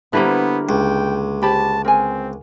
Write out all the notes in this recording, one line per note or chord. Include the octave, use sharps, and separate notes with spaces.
D3 G3 A#3 B3 E4 B4 C5
C#2 G5
G4 C5 A5 B5
C4 A#4 G#5